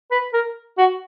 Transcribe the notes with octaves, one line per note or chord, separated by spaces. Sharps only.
B4
A#4
F#4